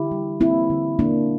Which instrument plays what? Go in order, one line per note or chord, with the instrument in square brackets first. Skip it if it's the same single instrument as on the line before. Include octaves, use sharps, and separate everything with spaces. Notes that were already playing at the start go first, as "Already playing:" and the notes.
Already playing: [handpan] D3 E4 G4
G3
A#3 C4 E4
D3
D3 A#3 D4